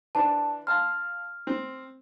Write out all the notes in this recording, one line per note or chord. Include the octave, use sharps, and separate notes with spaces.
E3 D4 C5 A5
F5 A5 C6 F6
C4